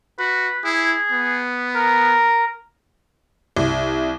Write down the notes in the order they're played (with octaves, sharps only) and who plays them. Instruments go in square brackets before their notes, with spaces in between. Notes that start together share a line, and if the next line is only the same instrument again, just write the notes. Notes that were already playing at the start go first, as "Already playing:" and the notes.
[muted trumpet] F#4 [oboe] B4
[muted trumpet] E4 [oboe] G#4
[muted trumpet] B3
[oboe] A#4
[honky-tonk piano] C2